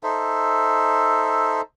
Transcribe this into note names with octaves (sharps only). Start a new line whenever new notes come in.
D#4 A4 C5 E5